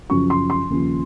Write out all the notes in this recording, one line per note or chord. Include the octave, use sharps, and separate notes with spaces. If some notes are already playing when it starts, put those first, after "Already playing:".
F#2 C#3 F3 C#6
C6
C6
D#2 C#3 F3